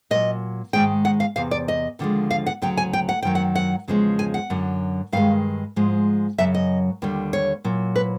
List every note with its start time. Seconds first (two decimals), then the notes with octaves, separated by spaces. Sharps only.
0.11 A#2 F#3 D#5
0.73 G#2 D#3 G#3 G5
1.05 F#5
1.20 F5
1.36 E2 C3 F5
1.51 D5
1.68 D#5
1.99 D#2 D3 F3 G#3
2.31 F5
2.46 F#5
2.62 D2 C#3 F#3 G5
2.77 G#5
2.93 G5
3.09 F#5
3.23 F#2 D#3 F#3 G5
3.35 F#5
3.55 F#5
3.88 E2 C#3 F3 G#3
4.19 G#5
4.34 F#5
4.50 F#2 D3 F#3
5.12 G2 D#3 G#3 F5
5.76 G#2 F3 G#3
6.38 F#2 C#3 F#3 E5
6.54 D#5
7.02 D#2 D3 G3
7.33 C#5
7.64 A#2 F#3
7.96 B4